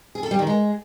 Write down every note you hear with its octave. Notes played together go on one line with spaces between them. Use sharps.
G#4
A4
G3
D#3
G#3